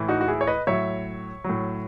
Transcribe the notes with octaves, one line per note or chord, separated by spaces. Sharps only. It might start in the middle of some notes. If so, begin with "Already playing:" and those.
Already playing: A2 E3
D#4 F#4
F#4
E4 G#4
C#5
B4 D#5
A2 F#3 C#5 E5
A2 F#3